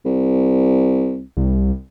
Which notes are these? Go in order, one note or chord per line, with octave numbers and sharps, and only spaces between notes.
C2
C2